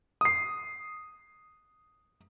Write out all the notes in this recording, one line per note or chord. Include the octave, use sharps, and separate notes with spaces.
D#6 C7